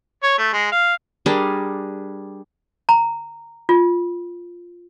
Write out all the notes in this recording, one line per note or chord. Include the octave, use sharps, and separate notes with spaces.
C#5
A3
G#3
F5
G3 D4 G#4 A#4
A#5
F4